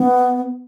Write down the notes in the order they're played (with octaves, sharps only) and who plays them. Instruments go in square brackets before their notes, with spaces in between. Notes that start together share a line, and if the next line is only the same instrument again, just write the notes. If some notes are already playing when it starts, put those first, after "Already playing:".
Already playing: [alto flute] B3